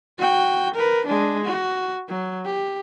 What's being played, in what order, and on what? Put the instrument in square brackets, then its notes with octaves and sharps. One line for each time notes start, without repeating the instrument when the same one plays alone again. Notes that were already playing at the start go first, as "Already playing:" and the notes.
[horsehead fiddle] F#4 G5
A#4 B4
G#3 D4
F#4
F#3
G4